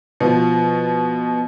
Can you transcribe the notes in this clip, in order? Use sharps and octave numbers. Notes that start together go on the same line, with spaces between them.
B2 F3